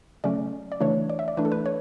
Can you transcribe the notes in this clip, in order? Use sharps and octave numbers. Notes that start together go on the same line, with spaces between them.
C#3 F#3 A3 C#4 D5
D5
C#3 E3 A3 D4 C#5
D5
E5
D5
E3 A3 D4 B4
A4
B4
C#5